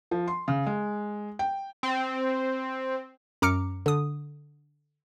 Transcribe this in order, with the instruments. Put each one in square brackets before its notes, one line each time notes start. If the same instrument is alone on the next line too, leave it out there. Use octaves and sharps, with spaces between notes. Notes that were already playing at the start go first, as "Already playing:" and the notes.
[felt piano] F3
C6
C#3
G#3
G5
[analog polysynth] C4
[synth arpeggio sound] F#2 A#5 D6 F6 C#7 D7
D3 D#6